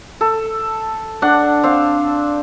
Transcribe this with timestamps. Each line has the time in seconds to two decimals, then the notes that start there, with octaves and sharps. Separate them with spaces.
0.21 A4
1.22 D4 F#5
1.64 C4 F5